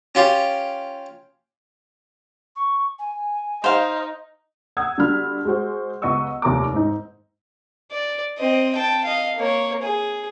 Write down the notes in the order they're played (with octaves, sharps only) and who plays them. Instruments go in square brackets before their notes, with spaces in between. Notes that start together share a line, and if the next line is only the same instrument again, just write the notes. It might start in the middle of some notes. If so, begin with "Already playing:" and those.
[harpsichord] C#4 F4 G4
[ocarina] C#6
G#5
[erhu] D#4 [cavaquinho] C5 F5
[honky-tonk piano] F#5 D#6 E6 G#6
D3 G3 F4 F#4 B5 F6
G#3 F#4 C5
C#2 B3 D#5 F#5 C#6 E6
F1 D#2 A#4 A#5 D6
G#2 D#4
[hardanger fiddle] D5
C4 D#5
G5 A5
D#5 F5
A#3 C#5
G#4